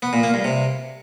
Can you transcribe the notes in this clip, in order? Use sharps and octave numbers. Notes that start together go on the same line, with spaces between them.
B3
A#2
A#3
G2
C3